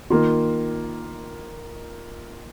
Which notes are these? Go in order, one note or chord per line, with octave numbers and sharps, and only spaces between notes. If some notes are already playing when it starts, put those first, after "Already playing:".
D#3 A#3 F4